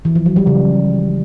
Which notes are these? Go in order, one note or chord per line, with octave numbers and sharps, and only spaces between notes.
E3
F3
F#3
G3
C#3